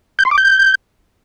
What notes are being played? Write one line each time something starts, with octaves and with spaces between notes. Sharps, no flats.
G6
C6
D6
G6